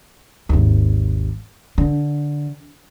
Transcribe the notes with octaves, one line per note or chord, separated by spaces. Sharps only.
G#1 D#2
D3